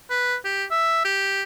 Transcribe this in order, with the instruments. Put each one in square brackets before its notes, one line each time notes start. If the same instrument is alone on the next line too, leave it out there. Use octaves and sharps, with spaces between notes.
[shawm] B4
G4
E5
G4